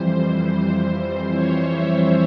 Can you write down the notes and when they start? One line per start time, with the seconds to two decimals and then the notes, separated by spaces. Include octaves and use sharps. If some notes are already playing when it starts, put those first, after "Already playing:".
Already playing: F2 E3 G3 C5
1.34 C#5
1.72 E5